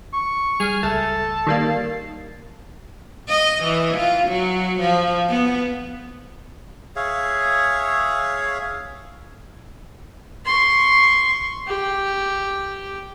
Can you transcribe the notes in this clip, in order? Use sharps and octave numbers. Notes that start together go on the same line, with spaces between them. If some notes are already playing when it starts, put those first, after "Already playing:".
C#6
G3 G#4 F6
C#2 A3 A4 A5
D#3 G3 A#3 D#4 A6 C7
D#5
E3
F4
F#3
F3
B3
G#4 C#5 E5 F5
C6 C#6
G4